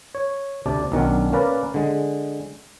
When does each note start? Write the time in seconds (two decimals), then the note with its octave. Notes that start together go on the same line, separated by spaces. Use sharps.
0.15 C#5
0.66 D2 C3 D5 A5
0.92 B1 D#3 F#3 C#4 D4
1.33 A#3 C#4 A#4 B4 D5
1.74 D3 G#3